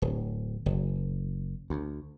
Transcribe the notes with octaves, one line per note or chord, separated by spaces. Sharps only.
D1
F#1
D2